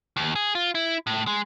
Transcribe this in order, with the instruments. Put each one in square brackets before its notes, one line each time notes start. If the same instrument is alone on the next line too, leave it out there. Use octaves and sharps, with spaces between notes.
[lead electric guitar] D#2
G#4
F4
E4
A2
G#3